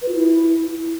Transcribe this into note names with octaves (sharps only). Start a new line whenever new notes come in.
B4
F4
E4